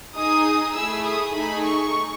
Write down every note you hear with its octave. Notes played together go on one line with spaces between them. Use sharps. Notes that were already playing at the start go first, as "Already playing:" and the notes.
D#4 G#4 D#6
A3 E4 G#4 E6
D#6
A3 D#4 G#4 B5
C#6